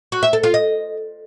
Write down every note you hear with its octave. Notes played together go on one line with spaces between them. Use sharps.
F#4
E5
A4
F4
D#5